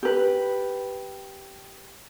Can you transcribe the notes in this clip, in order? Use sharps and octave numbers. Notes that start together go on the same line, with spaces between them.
G4 B4